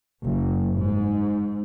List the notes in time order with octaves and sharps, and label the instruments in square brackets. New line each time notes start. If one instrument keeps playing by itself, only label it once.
[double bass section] F#1
G#2